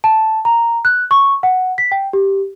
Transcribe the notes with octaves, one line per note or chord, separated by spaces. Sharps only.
A5
A#5
F#6
C#6
F#5
B6
G5
G4